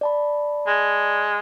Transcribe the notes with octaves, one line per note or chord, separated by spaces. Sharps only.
D5 A5 B5
G#3